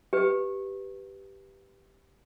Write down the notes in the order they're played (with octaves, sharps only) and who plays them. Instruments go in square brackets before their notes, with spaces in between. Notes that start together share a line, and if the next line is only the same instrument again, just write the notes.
[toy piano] G4 B4